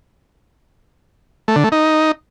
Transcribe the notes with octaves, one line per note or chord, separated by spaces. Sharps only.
A3
D3
A3
D#4